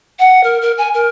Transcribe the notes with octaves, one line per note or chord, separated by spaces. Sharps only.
F#5
A#4
A#4
G#5
A#4